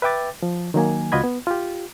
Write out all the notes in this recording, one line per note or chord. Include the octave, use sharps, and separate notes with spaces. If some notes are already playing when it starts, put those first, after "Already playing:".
B4 E5 G5 D6 A6
F3
D#3 F#3 A#3 G#5
C#2 F4 F#4 D#5 B5 G#6
B3
F4 G4